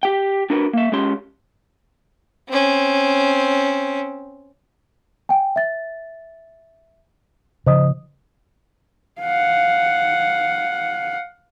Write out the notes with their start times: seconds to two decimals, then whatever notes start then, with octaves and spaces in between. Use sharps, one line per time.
0.03 G4 G5
0.50 D4 F#4 A#4 B4
0.73 A#3 E5
0.92 G#3 C#4 G4 C6
2.49 C4 C#4
5.29 G5 G#5
5.56 E5 A6
7.67 C#3 F3 C5 D#5 D#6
9.21 F5 F#5